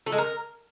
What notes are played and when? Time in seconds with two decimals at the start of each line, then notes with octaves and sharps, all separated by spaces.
0.06 A3
0.12 G#3
0.18 A#4